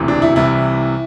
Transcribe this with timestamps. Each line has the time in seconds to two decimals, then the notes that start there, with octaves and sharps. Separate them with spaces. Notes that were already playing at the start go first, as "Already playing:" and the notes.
Already playing: E1 D2 C3 E3
0.08 D4
0.22 E4
0.36 C2 C3 E3 E4